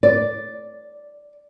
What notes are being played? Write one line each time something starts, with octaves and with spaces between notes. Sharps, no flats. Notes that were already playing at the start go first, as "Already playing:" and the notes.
D5